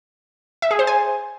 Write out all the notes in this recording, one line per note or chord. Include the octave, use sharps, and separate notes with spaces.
E5
G#4
C5
G#5